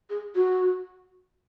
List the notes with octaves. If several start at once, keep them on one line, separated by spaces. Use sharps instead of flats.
G#4
F#4